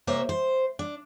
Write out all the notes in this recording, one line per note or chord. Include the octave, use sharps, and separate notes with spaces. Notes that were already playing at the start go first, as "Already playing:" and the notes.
C3 A#3 C5 C#5 E5
C5
D4